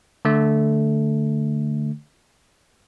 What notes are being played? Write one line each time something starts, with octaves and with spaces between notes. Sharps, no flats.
D3 A3